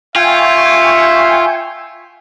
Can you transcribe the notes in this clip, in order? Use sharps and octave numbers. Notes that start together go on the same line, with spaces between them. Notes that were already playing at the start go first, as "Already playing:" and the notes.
F4 E5 G5 G#5 C#6